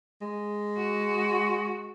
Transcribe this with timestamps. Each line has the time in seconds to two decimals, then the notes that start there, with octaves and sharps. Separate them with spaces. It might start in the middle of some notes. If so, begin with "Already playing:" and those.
0.21 G#3
0.77 F#4